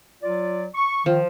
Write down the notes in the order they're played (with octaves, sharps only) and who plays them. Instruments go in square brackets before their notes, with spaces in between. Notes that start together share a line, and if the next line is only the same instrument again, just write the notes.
[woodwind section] F#3 F4 D5
C#6
[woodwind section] D#3 [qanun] F3